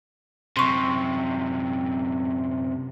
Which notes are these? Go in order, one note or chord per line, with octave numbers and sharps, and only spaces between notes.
F#2 C3 C6 C#6